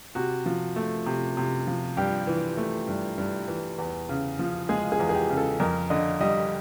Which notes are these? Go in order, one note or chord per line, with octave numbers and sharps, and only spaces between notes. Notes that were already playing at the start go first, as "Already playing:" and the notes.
C3 F#4
F3
A3
C3
C3
F3
G2 G4
E3
A3
G2
G2
E3
E2
C#3
F3
G#3 G#4
G#4
E2
G#4
G4
C#3
A4
F2 A#4
D3 D#5
G3 D#5